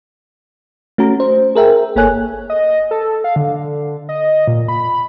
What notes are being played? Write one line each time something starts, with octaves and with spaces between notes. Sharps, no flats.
A3 C#4 F#4 A#5
C5
G#4 A#4 E5 G5
G1 A#3 A4 C#5 G#5 F#6
D#5
A4
F5
D3
D#5
A#2
B5